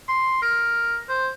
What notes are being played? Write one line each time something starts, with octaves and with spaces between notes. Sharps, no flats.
C6
A#4
C5